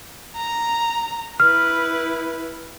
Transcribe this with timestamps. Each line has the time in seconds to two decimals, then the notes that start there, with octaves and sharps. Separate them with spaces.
0.36 A#5
1.40 E4 B4 F6